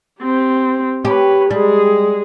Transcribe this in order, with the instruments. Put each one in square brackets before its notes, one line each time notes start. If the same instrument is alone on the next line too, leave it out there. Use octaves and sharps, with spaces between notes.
[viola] C4 G4
[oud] G4 [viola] B4 C#5
[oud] G3 [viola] G#3 G#4